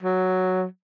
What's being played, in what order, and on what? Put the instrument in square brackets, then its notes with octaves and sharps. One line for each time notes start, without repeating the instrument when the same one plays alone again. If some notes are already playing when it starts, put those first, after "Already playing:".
[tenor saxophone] F#3